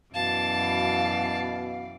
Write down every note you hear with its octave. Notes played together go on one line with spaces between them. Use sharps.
F#2 B2 E3 D5 F5 A5